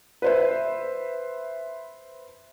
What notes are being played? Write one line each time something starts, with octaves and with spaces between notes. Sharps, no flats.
B4 C5 E5